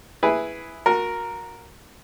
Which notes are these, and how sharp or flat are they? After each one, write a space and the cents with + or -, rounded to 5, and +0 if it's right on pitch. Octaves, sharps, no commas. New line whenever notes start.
E4 +0 G#4 +0 B4 +0
F#4 -30 A#4 +0